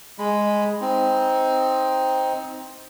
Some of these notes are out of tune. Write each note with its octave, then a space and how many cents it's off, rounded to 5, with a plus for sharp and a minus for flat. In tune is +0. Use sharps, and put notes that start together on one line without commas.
G#3 +0 B5 +0
C4 +0 D#4 +15